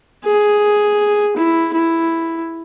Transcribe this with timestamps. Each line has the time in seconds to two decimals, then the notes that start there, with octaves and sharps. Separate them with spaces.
0.25 G#4
1.36 E4
1.73 E4